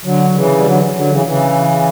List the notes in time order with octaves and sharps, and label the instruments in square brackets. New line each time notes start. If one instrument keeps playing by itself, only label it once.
[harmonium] D3 F#3
D3
C#3 E3
G3
D3 F#3
D3 F#3
C#3 E3
C#3 E3